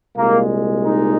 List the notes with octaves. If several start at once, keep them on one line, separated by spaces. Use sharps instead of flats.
C2 A#2 G#3 A#3
D#4